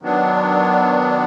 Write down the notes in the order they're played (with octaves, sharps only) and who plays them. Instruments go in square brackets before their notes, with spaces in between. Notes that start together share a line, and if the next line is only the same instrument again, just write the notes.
[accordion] D#3 F#3 B3 D4